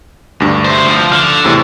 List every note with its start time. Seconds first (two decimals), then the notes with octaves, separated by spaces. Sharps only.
0.40 D2 G2
0.66 C5 E5
0.88 F3
1.12 D3 F6
1.44 E2 A2 C3